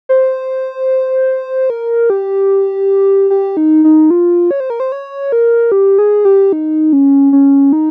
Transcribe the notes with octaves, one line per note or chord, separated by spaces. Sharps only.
C5
A#4
G4
G4
D#4
D#4
F4
C#5
C5
A#4
C5
C#5
A#4
G4
G#4
G4
D#4
C#4
C#4
D#4